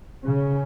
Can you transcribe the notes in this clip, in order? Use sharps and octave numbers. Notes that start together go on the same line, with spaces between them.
C#3